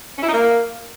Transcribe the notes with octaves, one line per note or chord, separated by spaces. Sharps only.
C#4
E4
D#4
A#3